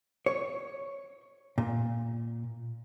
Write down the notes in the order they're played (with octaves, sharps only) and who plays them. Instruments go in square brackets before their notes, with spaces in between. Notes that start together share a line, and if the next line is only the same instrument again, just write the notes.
[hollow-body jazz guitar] C#5
A#2